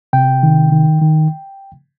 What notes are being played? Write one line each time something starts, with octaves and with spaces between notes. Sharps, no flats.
C3 G5
D#3
D#3
D#3